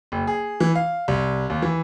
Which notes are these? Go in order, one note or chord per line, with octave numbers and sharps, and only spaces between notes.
F#1
G#4
E3
F5
C2
D#2
E3